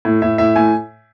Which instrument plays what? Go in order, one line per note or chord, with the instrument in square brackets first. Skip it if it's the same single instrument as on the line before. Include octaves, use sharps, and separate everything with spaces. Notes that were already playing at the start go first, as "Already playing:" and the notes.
[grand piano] A2
A2 E5
A2 E5
A2 G#5